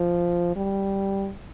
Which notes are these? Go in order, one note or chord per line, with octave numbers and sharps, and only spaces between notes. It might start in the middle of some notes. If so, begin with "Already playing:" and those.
Already playing: F3
G3